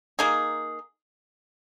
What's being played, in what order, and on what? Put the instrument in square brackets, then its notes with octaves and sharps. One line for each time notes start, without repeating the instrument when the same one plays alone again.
[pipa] A#3 D#4 G#4